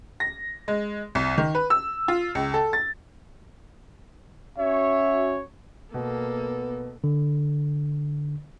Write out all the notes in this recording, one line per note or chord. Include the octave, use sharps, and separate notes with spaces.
A#6
G#3
C2
D#3
B4
E6
F4
C#2
A4
A6
C#4 F#4 C#5 E5
B2 A#3 B3 A4
D3